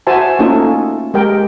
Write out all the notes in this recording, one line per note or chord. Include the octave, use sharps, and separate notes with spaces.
F#4 C5 E5 G#5 A5
A3 A#3 C#4 D#4 F4 A4
G#3 G4 A#4 G5